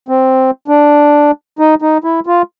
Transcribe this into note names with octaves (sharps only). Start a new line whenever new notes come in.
C4
D4
D#4
D#4
E4
F4